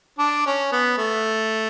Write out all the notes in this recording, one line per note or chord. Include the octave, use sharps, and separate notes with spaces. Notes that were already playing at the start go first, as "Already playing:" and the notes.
D4
C#4
B3
A3